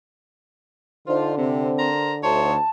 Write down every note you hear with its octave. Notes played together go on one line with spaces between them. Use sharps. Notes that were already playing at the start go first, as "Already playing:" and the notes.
D3 D4 D#4 F4 C5
C3 C4
A#4 C5 A#5
D2 D#4 C5 C#5 A5